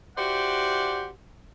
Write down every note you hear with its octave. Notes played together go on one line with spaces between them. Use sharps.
E4 F#4 G4 C5 D5 F#5